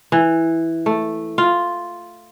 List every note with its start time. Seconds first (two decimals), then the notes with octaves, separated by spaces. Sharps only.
0.12 E3
0.86 A3
1.38 F4